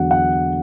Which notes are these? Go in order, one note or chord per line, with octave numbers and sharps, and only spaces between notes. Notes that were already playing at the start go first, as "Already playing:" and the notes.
Already playing: E2 D3 F#3 F#5
F#5